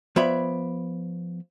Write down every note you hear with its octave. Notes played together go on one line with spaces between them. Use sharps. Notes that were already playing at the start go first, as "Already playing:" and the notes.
F3 B3 C#5 D5 E5 B5